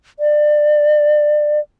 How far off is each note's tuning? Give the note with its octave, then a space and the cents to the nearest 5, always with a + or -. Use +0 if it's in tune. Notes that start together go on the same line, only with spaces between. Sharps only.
D5 +25